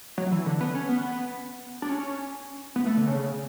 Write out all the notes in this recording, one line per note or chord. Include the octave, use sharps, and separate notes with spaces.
F#3
E3
D3
B3
C#4
B3
D4
C#4
B3
A3
D3
C#3